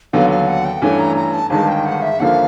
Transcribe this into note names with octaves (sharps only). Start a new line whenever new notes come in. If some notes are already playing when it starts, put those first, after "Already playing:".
D#2 D3 F#3 B3 F5
F5
F#5
G5
G2 E3 A3 C#4 G#5
A#5
A#5
A5
G1 G2 D#3 G#3 A5
G5
F#5
E5
D#2 D3 F3 A#3 F5 F#5